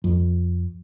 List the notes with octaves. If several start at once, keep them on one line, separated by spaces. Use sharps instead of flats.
F2